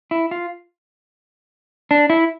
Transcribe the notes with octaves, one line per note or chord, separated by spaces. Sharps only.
E4
F4
D4
E4